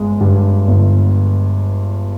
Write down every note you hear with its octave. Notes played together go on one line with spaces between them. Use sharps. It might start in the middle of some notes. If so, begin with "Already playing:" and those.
Already playing: G1 G#3
G2
G1